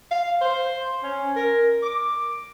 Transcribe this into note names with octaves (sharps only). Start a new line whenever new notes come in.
F5
C5
C#4
A#4
D6